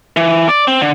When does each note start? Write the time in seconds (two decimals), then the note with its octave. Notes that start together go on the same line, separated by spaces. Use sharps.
0.17 E3
0.49 D5
0.68 C4
0.81 D3